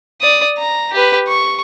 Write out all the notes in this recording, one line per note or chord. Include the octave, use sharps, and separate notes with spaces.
D5 D#6
A#5
G4 B4
C#6